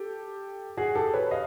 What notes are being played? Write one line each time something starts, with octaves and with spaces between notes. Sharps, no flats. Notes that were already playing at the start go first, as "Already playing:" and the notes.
Already playing: G4 A4
F#4 G#4
G4 A4
B4 C#5
D#5 F5